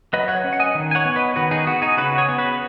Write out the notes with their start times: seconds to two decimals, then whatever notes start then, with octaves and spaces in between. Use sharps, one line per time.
0.13 F#3 B4 D#5
0.28 C#5 F#5
0.44 C#4
0.53 F#5
0.60 D#5 G#5
0.75 D#3
0.91 G#5
0.95 C#5 F#5
1.05 B3
1.16 B4 D#5
1.36 D#3 F#4 B4
1.51 D#4 G#4
1.67 B3 F#4
1.82 D#4 G#4
1.97 C#3 F#4 B4
2.18 G#4 C#5
2.29 B3
2.38 F#4 B4